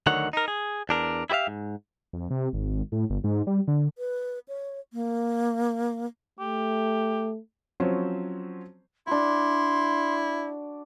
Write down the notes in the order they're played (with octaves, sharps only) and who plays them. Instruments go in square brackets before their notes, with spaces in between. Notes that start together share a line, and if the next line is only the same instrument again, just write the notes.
[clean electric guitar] D2 D3 D#3 F#3 C#5 F#5
D#4 A#4
G#4
E2 D4 A#4
E4 G4 C5 E5 F5
G#2
[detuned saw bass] F2
C3
G#1
A2
G1
G#2
G3
D3
[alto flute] B4
C#5
A#3
[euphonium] A3 [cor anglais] G4
[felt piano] F3 F#3 C4 C#4 C5
[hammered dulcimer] D4 F#4 [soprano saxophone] E4 [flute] C6